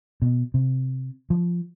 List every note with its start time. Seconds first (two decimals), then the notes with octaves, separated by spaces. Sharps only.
0.22 B2
0.54 C3
1.30 F3